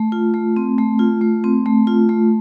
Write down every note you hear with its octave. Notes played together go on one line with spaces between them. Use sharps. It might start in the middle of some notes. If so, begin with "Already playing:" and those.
Already playing: A3
F4
A3
C4
A3
F4
A3
C4
A3
F4
A3